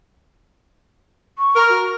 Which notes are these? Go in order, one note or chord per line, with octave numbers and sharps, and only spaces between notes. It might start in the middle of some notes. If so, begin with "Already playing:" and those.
C#6
A#4
F#4